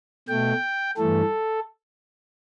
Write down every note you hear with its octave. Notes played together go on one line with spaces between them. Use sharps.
B2 A3 G5
G2 E3 A3 A4